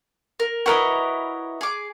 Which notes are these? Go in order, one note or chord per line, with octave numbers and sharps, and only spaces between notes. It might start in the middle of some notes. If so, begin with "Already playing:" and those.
A#4
E4 F#4 A#4 B4 C#5 D#5
G#4 D6